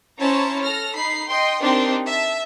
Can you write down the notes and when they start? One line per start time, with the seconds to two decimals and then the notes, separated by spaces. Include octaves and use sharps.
0.21 C#4 E4 C5 C#5 A5 A#5
0.62 A4 F6 A#6
0.96 D#4 B5 C7
1.28 D#5 G5 C6
1.61 C4 D4 D#4 G4 A#4 C6
2.06 E5 A5